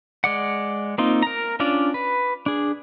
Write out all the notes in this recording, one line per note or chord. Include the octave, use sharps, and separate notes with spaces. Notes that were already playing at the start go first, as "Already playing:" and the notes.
G#3 D5 F#5
A#3 C4 D#4 F4
A#4 A#5
C#4 D4 F4 D5
B4
D4 G#4